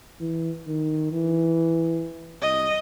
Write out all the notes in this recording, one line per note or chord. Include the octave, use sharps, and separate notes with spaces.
E3
D#3
E3
C2 D#5